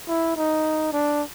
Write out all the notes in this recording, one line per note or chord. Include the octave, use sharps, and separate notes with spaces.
E4
D#4
D4